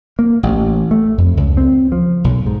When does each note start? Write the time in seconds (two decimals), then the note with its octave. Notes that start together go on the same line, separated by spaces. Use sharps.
0.19 A#3
0.43 A1
0.91 A3
1.18 F2
1.37 C#2
1.57 C4
1.92 F3
2.24 B1
2.46 G#2